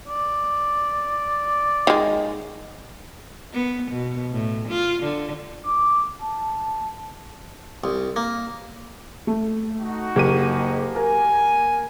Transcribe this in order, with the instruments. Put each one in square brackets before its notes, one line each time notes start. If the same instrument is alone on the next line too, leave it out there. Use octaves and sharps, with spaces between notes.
[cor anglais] D5
[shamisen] D#3 G#3
[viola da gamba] B3
B2
A2
F4
D3
[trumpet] D6
A5
[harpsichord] C2
A#3
[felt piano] A3
[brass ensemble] D#4 F#4
[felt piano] F#1 [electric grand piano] A#3 G4 D#7
[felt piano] A#4 [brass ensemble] G#5